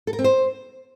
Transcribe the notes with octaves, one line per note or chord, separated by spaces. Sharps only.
A4
A#4
C4
C5